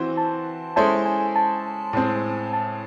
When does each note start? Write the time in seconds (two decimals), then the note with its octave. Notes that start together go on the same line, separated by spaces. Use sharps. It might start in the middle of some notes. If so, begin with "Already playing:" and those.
Already playing: E3 C4 F#4 C5
0.17 A5
0.76 G#3 C#4 E4 A4 C5 A5
1.05 G#5
1.36 A5
1.93 A2 G#3 C4
2.53 A5